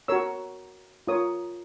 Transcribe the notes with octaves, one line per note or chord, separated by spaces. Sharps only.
F#4 A#4 C#5 E6
F4 A#4 C#5 D#6